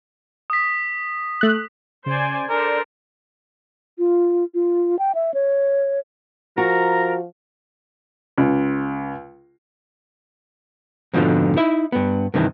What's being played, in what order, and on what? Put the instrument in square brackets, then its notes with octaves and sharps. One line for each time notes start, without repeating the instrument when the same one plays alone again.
[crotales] D#6 B6
[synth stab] A3 F#6
[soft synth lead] C#3 [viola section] C5 D5 G#5
[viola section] D4 A4 C5 [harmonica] A#4 [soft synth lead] D5
[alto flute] F4
F4
G5
E5
C#5
[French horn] F3 [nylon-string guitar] F#4 [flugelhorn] A#4 [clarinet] A#5
[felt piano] C#2
[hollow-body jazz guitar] F2 G#2 B2 D3 F3
D#4 E4 E5
G2 B3
G2 C3 D#3 E3